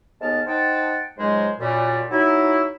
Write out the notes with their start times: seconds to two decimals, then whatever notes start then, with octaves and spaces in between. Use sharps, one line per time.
0.21 D#2 G#3 B3 A5 F6
0.47 D#4 C5 F#5 G5 A5
1.18 C#2 G#2 F#3 G#3 C5 G#5
1.60 F#2 A#2 G3
2.11 F#3 D#4 E4